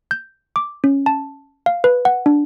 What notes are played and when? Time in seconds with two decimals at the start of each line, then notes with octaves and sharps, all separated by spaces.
0.11 G6
0.56 D6
0.84 C#4
1.06 A5
1.66 F5
1.84 B4
2.05 F#5
2.26 D4